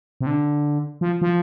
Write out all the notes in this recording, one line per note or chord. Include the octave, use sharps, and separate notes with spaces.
C3
D3
F3
F3